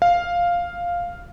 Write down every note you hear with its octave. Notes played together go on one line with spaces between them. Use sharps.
F5